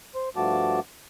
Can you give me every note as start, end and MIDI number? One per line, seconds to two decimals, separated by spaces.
0.15 0.29 72
0.36 0.80 43
0.36 0.80 53
0.36 0.80 57
0.36 0.80 66
0.36 0.80 81
0.36 0.80 86